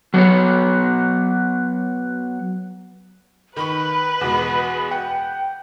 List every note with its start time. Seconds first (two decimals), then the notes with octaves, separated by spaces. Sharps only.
0.14 F#3 B3 C#5
3.57 D#3 B4 B5 C#6
4.21 E2 B2 G#3 F#5
4.91 F#5 G5